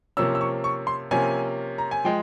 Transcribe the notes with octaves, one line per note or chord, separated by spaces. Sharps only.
C3 F3 A#3 C#4 E6
E6
C#6
C#6
C6
C3 F3 A#3 C#4 G#5
A#5
G#5
F3 G#3 G5